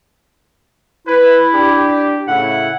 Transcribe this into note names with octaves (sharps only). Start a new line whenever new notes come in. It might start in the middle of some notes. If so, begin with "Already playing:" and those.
E4 B4
D4 G4
A2 C#3 E4 F#5